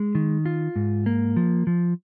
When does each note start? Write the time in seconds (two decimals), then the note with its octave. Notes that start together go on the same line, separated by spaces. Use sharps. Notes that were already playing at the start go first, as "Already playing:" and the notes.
Already playing: G#3
0.15 D#3
0.46 F4
0.76 G#2
1.06 A#3
1.37 F3
1.67 F3